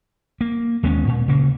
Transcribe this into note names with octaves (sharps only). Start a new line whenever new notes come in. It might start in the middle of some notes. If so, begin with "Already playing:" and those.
A#3
D#2 G#3 B3 C#4
A#2
C#3 A#3